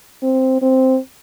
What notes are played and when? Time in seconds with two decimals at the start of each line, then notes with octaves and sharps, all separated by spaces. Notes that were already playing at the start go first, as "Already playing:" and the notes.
0.23 C4
0.62 C4